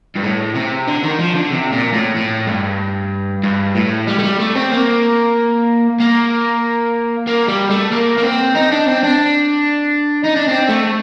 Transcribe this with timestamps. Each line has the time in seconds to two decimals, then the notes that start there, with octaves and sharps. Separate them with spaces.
0.16 G2
0.24 A2
0.55 C3
0.87 D3
1.03 D#3
1.19 F3
1.36 D3
1.51 C3
1.73 A#2
1.94 A2
2.16 A2
2.47 G2
3.43 G2
3.75 A2
4.07 G3
4.18 A3
4.23 G3
4.39 A3
4.55 C4
4.71 A#3
6.00 A#3
7.27 A#3
7.48 G3
7.70 A3
7.91 A#3
8.18 A#3
8.23 C4
8.55 D#4
8.71 D4
8.87 C4
9.03 D4
10.24 D#4
10.35 D4
10.48 C4
10.68 A3